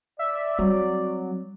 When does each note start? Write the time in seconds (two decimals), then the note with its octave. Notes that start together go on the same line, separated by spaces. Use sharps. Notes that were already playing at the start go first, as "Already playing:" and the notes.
0.19 D5 E5
0.59 F#3 G3 C4